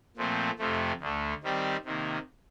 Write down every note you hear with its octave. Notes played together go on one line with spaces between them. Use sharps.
A#2 F3 A3 C4
F2 C3 F3 A3
D2 D3 A3
D#3 G3 C4 G4 D5
C3 D#3 A#3